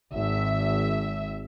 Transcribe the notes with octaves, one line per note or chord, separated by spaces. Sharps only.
G#1 E5